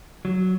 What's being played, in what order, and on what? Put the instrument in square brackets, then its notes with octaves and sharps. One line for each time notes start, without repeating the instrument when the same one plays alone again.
[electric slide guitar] F#3